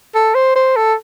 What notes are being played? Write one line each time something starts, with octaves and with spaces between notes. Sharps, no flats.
A4
C5
C5
A4